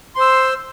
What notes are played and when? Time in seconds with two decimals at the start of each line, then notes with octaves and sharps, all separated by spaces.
0.15 C6
0.18 C5
0.21 E6